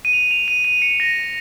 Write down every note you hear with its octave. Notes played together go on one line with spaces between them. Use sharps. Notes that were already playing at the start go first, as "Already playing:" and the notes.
D#7
F7
F7
D#7
D#7
C#7
A#6